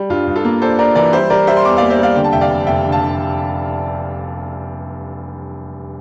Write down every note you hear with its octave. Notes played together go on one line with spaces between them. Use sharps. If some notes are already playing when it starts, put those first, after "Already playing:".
Already playing: G3
G2 F4
G2
F4 A4
A#3
D4 A4 C5
D4 A#4 D5
E3 A#4 D5
G3 C5 E5
G3 A#4 D5
G3 C5 E5
C6
E2 A#5 D6
D5 F5
A#3
C5 E5
G3 D5 F5
D3 G5
A5
F1 E5 G5
D5 F5
F1
F1 E5 G5
D3
F5 A5
D3